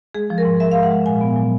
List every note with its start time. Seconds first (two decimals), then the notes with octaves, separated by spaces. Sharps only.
0.15 G#3 G#4
0.30 F3
0.38 A#4
0.45 G#2
0.60 G#3 E5
0.71 F5
0.75 G#2
0.83 F#5
0.91 G#3
1.06 A#2 G#5
1.21 B3
1.36 F#3